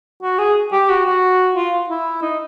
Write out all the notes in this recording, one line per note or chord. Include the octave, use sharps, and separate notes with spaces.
F#4
G#4
G4
F#4
F#4
F4
E4
D#4